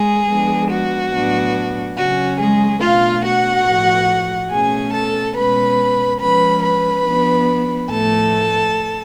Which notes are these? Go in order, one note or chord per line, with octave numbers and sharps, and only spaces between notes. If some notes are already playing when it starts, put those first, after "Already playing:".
Already playing: G#3 G#4
F3 G#3 B3 D4
F#4
A2 F#3 B3 D4
C#3 F#3 C#4 F#4
G#3 G#4
B2 A3 D4 F4 F5
F#4 F#5
A2 F3 A3
B2 A3 C#4 G#4 G#5
A4 A5
B2 G#3 C#4 B4 B5
F3 G#3 C#4 B4 B5
B4 B5
F3 B3 D4
A2 F3 A3 A4 A5